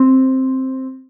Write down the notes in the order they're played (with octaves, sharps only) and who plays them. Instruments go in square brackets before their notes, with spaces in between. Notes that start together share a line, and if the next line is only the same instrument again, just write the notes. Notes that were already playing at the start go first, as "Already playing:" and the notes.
Already playing: [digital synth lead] C4